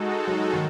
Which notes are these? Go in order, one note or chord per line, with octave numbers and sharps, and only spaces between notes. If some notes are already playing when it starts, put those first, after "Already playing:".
Already playing: G#3 D#4 F#4 A4
F#3
D#3